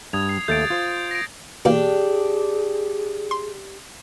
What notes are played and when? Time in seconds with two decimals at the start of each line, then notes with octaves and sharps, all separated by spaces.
0.13 G2 D#6 G#6 F7
0.29 C7
0.48 D#2 A3 E5 G6 A6 D7
0.70 F4 C5
1.11 A#6 D7
1.65 B2 E3 A#3 D4 G4 G#4
3.31 C6